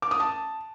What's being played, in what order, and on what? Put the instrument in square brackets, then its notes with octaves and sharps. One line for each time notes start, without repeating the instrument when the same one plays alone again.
[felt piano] D6
D#6
A5